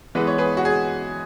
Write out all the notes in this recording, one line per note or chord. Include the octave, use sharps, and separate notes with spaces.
E3 G#3 B3 B4
C#5
G#4 B4
F#4
G#4